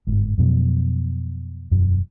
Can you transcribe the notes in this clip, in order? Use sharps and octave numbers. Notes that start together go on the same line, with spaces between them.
G1 G#2
F2 B2 F#3
E1 F#2